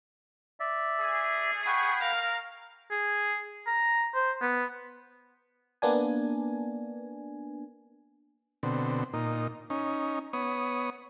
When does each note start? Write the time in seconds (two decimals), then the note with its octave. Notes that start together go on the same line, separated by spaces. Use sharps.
0.60 D5 E5
1.00 A3 G#4
1.66 F#5 G5 B5 C#6
2.01 A#4 F5
2.91 G#4
3.66 A#5
4.14 C5
4.41 B3
5.82 A#3 B3 D4 G#5
8.63 B2 D3 C4
9.13 A#2 D#4
9.70 C#4 D#4
10.33 B3 C#5 D#6